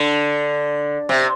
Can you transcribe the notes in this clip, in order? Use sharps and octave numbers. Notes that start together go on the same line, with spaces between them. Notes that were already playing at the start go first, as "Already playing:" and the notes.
Already playing: D3
C3